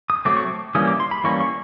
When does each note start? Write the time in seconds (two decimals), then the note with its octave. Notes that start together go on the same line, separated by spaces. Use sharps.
0.10 D#6
0.25 F#3 A3 C4 D6
0.37 C#6
0.47 D6
0.75 E3 G3 A#3 C#4 D#6
0.87 D6
1.00 C6
1.11 B5
1.24 E3 G3 A#3 C#4 C#6
1.41 C#6